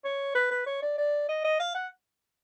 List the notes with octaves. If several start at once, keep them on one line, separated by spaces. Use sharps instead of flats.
C#5
B4
B4
C#5
D5
D5
D#5
D#5
F5
F#5